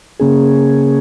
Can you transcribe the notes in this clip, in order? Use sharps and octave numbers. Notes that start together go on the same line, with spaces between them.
C#3 A#3 C#4 G#4